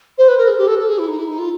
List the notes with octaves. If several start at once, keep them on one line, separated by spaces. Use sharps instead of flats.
C5
B4
A#4
G#4
G4
A4
A4
G#4
E4
D#4
E4
D#4
F4